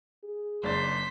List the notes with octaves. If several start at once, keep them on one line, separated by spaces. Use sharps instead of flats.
G#4
F#1 D4 C5 A6 B6